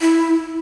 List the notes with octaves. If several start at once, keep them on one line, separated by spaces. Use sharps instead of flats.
E4